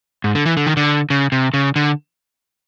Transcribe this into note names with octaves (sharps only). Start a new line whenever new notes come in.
G#2
D3
E3
D3
D#3
D3
C#3
C3
C#3
D3